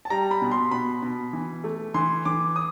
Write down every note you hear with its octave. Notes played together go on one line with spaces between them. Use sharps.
A5
G3 A#5
B5
B2
C6
B2 B5
B2
E3
A3
E3 C6
E3 D6
D#6